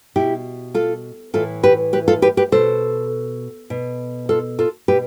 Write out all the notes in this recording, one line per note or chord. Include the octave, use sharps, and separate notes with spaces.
B2 E4 G4
F4 A4
A2 E3 F4 A4
G4 B4
G4 B4
F4 A4
G4 B4
G4 B4
B2 A4 C5
B2
F4 A4
F4 A4
B2 G4 B4